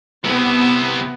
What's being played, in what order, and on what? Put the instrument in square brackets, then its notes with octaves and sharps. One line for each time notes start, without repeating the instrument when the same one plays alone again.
[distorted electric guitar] C3 E4 [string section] B3